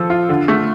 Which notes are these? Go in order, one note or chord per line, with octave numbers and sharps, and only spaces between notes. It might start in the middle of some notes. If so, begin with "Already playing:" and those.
Already playing: F3 A4
F4
D3
A3